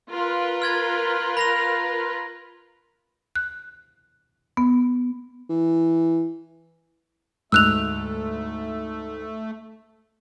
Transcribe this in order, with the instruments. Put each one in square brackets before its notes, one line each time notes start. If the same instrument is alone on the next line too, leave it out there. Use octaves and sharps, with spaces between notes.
[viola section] F4 A#4 B4
[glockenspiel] F6 G#6 A6
B5 A#6 F7
[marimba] F#6
B3
[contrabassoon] E3
[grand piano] D2 G#2 [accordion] A3 [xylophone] E6 F#6 F7